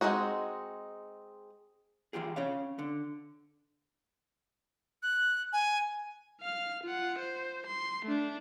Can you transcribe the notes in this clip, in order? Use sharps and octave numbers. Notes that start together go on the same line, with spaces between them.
G#3 A3 C4 D#4 F#4
E3 F4 G4 G#4
C#4 C#5 F5
D3
F#6
G#5
F5 F6
F4 F#5
C5
C6
A3 D4